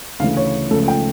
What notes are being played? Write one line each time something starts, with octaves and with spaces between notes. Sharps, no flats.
D2 C#3 E3 A3 F5
C#5
C#2 C#3 F3 A3 A4
G5